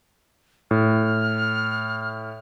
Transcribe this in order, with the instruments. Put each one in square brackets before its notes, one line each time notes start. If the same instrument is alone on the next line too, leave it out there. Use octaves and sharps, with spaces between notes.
[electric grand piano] A2 [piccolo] F6